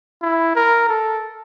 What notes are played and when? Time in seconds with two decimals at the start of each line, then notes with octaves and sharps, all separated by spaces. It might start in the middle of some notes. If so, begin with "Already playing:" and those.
0.22 E4
0.55 A#4
0.89 A4